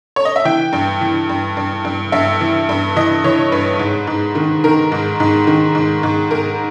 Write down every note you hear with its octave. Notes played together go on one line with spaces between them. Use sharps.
C#5
D#5
E5
E3 G5
G2
E3
G2
G2
G2
G2 E5
E3
G2
E3 D#5
E3 C#5
G2 B4
G#2
G#2
D#3
D#3 A#4
G#2
G#2
D#3
G#2
G#2
G#2 A#4